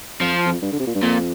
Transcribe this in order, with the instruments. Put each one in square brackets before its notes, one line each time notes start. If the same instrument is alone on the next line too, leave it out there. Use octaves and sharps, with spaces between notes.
[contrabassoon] F2 [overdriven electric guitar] F3
[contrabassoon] F2
G2
D3
C3
A#2
G2
[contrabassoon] F2 [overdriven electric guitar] A#2